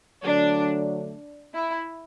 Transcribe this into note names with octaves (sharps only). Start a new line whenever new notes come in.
D3 F#3 A3 D4
E4